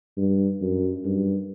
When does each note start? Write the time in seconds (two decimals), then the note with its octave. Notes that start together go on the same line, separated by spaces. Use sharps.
0.17 G2
0.61 F#2
1.05 G2